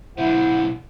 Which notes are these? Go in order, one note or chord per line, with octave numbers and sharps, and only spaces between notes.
B1 D3 E4 C5 F#5